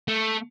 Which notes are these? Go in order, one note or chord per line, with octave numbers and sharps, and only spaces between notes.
A3